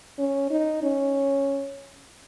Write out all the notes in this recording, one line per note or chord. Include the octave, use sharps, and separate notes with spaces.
C#4
D#4
C#4